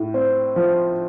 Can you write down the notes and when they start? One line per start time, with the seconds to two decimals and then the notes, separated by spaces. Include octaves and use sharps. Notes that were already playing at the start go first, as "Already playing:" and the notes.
Already playing: A2
0.14 C4
0.56 F3